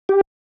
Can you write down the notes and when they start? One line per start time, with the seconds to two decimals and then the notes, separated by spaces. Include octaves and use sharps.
0.09 G4